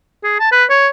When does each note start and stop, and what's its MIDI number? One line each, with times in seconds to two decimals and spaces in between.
0.23 0.37 68
0.40 0.51 81
0.52 0.65 71
0.70 0.88 73